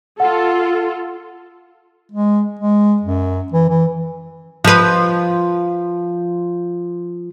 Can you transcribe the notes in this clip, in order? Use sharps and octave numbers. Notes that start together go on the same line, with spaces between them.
F4 A4 F#5
G#3
G#3
F#2
E3
E3
F3 B4